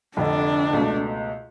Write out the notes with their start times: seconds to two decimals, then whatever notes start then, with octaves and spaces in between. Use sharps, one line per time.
0.17 F1 F2 D3 D4
0.73 C#2 B2 A3